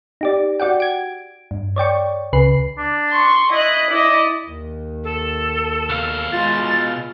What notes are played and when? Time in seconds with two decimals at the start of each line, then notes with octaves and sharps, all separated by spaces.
0.21 D#4 G4 D5
0.60 F#4 D5 F#5 G5
0.80 G#6 D7
1.51 G2
1.76 C#5 D5 G5 C#6
2.33 C#2 C#3 B4 C7
2.78 D4
3.10 C6 C#6
3.51 E4 D#5 F#6
3.90 E4 D5 D#5
4.46 D#2
5.04 A4
5.89 B2 F5
6.32 G#3 F4 A6